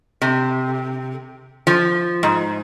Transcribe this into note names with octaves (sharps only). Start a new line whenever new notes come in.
C3
F3
G#2